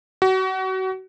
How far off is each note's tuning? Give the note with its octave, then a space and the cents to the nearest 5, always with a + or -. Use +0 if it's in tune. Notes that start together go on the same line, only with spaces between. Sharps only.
F#4 +30